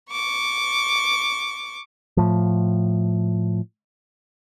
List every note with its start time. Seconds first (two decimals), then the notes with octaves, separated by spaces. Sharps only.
0.11 C#6 D6
2.17 A2 F3